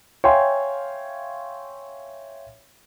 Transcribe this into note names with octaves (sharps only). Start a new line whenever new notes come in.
C#5 E5 F5 G5 G#5 C6